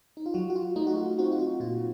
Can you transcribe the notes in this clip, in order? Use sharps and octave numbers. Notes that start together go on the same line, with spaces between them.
D#4
F4
F#3 F#4
F#4
F4
A3 D#4
F#4
F4
C4 F#4
F4
F#4
A#2 F4